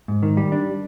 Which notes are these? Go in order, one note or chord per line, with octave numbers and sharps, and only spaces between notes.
G#2
D#3
G3
D4